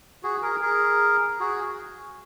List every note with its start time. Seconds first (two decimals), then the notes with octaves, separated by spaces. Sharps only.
0.23 F#4 G#4
0.42 G#4 A#4
0.62 G#4 A#4
1.40 F#4 G#4